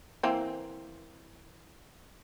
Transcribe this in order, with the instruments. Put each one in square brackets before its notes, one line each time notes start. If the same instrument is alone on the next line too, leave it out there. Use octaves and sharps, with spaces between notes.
[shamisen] E3 A#3 C4